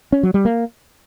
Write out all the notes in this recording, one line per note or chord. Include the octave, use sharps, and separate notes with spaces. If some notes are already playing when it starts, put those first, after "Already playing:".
C#4
F#3
G3
A#3